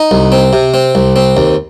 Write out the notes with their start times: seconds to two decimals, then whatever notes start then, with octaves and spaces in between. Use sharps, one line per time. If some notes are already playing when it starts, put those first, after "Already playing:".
Already playing: D#4
0.11 C2
0.32 C4
0.53 C3
0.74 C4
0.95 C2
1.16 C4
1.37 D#2